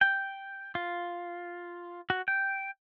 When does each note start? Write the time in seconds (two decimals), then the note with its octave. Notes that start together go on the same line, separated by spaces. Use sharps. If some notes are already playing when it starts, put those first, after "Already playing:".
0.01 G5
0.75 F4
2.10 F#4
2.28 G5